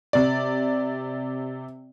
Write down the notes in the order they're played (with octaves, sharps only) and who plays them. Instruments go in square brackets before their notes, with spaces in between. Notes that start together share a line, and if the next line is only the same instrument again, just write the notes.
[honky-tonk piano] C3 D5